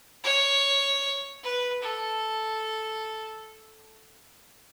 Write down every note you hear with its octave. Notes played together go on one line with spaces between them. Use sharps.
C#5
B4
A4